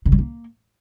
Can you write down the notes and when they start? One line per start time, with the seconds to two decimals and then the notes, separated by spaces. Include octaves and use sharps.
0.05 C#3
0.12 G3
0.18 A#3